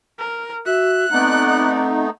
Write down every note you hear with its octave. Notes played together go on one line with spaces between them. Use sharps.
A#4
F#4 E5 F#6
A3 B3 C4 D#4 D5 F#5